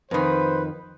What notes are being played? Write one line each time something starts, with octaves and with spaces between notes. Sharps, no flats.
F2 D#3 B4 C5